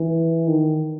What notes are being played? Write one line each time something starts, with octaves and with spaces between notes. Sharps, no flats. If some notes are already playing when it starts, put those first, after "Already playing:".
Already playing: E3
D#3